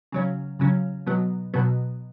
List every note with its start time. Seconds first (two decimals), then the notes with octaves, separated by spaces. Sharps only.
0.12 C#3 F#3 C#4
0.59 C#3 F#3 C#4
1.06 B2 F#3 B3
1.54 B2 F#3 B3